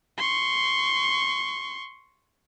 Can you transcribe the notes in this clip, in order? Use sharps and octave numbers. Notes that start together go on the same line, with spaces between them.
C6 C#6